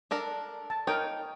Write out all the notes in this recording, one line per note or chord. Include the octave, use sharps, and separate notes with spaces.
D4 A4 A#4
A5
D#4 A#4 C#5 G5